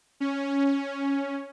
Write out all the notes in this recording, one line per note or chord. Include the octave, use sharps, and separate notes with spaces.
C#4